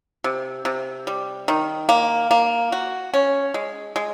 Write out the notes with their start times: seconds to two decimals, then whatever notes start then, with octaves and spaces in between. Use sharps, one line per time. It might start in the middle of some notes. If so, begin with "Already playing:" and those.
0.24 C3
0.65 C3
1.07 G3
1.48 D#3
1.89 A#3
2.31 A#3
2.72 F#4
3.14 C#4
3.54 G#3
3.96 G#3